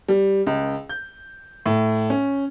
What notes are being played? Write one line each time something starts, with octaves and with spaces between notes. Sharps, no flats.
G3
C#2
G6
A2
C#4